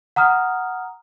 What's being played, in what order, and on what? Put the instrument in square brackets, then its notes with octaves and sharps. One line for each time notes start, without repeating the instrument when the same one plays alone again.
[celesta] F#5 A#5 D#6 F6